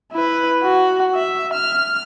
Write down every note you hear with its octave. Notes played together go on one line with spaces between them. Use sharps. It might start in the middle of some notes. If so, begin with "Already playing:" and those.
E4 B4
F#4
E5
F6